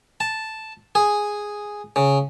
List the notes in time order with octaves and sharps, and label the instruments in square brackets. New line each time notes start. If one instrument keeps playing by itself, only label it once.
[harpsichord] A5
G#4
C#3